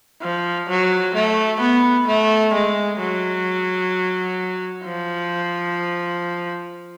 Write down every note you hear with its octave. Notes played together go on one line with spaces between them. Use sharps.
F3
F#3
A3
B3
A3
G#3
F#3
F3